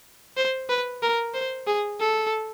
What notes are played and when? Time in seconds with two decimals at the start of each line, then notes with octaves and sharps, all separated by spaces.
0.37 C5
0.70 B4
1.03 A#4
1.34 C5
1.67 G#4
2.00 A4